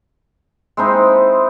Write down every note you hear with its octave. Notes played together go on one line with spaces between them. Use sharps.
G#3 C4 D#4 E4